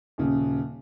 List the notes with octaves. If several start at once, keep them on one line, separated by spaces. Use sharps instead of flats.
D#1 C#3